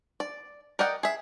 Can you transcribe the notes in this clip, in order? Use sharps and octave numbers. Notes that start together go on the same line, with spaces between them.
D5
A#4 D5 D#5 F#5 G5
G#4 E5